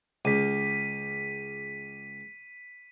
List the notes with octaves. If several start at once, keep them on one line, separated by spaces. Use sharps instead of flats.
C#2 B6 D#7